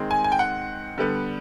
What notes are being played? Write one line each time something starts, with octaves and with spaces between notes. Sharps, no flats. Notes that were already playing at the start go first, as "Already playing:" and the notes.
Already playing: D#3 G#3 C4
G#5
G#5
G5
F#5
D3 G3 B3